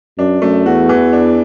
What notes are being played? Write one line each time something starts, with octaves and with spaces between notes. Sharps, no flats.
F#2 D4
F#2 A3
E2 F#4
E3
D4